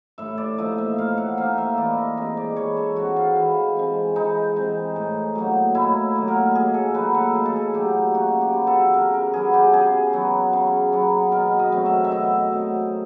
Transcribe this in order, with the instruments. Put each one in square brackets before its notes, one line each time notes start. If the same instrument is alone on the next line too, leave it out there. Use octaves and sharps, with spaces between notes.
[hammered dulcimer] A2 E5
D5
F3 A#3 D#4 D#5
E5
A2 F5
F#5
F3 A#3 D#4 F5
E5
E3 D5
D#5
G#3 C4 D#5
D5
E3 C#5
A4
G#3 C4 F#4
F4
E3
G#3 C4
E3 D#4
G#3 C4
A2
F#3 A#3 D#4
A2 E4
F#3 A#3 D#4
A#4
A2 G#4
A4
F#3 A#3 D#4 B4
A4
A2 G#4
A4
G#4
F#3 A#3 D#4 G4
C#3 F#4
G4
F#3 B3
A4
C#3 A#4
A#4
F#3 B3 G#4
G4
C#3 G#4
F#3 B3
C#3
F#3 B3
B2 A#4
D#5
F#3 A3 C4
E5
E5
B2 D#5
F#3 A3 C4